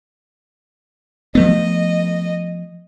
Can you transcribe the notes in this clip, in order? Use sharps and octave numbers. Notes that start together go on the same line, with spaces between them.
F3 A3 B3 D#5